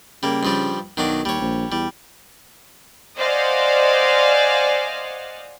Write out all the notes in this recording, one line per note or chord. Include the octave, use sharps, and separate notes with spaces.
C#3 G3 A#3
G2 F3 G3
B1 D#3 F#3 D4
D#2 G3 C#5
A#1
E2 G3
C5 D5 D#5 F5 F#5 G#5